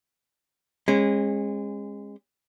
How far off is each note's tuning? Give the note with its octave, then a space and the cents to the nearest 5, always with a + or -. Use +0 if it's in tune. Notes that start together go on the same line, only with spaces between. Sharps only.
G#3 -20 C#4 -40